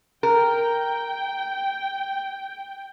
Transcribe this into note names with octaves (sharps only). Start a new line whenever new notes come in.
A#4 G5